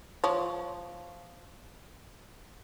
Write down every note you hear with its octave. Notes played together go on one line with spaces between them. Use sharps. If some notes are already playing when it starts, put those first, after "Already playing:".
F3 C#5